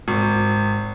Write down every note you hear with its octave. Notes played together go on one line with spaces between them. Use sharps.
G#1